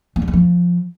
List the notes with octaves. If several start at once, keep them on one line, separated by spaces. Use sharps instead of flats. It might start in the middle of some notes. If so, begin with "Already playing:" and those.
A3
G3
G#3
F3